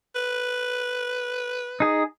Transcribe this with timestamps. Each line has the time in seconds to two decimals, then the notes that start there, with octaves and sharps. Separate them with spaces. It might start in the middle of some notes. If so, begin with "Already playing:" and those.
0.15 B4
1.80 D#4 G#4